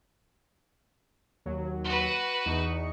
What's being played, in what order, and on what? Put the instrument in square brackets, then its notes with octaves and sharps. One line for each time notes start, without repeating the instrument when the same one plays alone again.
[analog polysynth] D#2 F#3
[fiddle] F#4 B4
[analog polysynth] E2 D#4 C#6